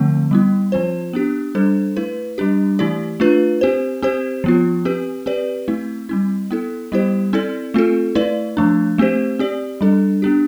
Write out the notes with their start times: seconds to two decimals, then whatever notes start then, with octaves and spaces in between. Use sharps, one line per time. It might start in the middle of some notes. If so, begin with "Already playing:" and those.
Already playing: D3 F3 A3 C4
0.31 G3 B3 E4
0.72 F3 C4 F4 C5
1.13 B3 D4 G4
1.55 G3 D4 A4 C5
1.97 A3 E4 B4
2.38 G3 D4 G4
2.79 E3 A3 E4 G4 D5
3.20 A3 D4 F4 B4
3.61 C4 G4 C5
4.02 C4 G4 C5
4.44 F3 B3 F4
4.85 C4 G4 B4
5.26 C4 G4 B4 D5
5.68 A3 C4 E4
6.09 G3 C4 E4
6.51 B3 E4 A4
6.92 G3 B3 E4 G4 C5
7.33 C4 E4 A4 D5
7.74 A3 C4 F4 A4
8.15 A3 E4 B4 D5
8.57 F3 A3 D4
8.98 A3 C4 G4 C5
9.39 C4 G4 D5
9.81 G3 D4 A4
10.22 B3 D4 G4